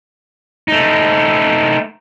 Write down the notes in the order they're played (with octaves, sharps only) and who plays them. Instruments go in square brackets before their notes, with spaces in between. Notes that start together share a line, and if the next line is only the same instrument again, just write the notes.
[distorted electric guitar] A3 D#4